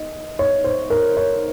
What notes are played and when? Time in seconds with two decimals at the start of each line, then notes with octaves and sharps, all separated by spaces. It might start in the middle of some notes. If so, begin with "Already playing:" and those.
Already playing: D#5
0.39 C#5
0.64 C5
0.90 A#4
1.17 C#5